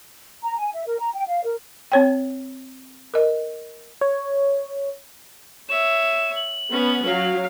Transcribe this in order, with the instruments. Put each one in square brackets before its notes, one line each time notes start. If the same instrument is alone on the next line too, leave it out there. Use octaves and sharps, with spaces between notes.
[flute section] A#5
G#5
E5
A#4
A#5
G5
F5
A#4
[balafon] C4 C#5 G5
A#4 D#5
[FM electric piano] C#5
[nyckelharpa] C#5 E5 [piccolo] E7
[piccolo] F#7
[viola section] B3 [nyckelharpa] C#4
[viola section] F#3 [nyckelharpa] F5